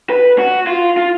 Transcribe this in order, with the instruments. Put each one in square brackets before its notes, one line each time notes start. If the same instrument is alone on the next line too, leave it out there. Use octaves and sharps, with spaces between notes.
[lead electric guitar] B4
F#4
F4
F4